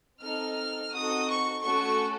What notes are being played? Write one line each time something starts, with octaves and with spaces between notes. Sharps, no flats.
C4 D#4 A4 F6
C4 D#4 F#4 A4 D#6
C#6
A3 C#4 F#4 A4 C#6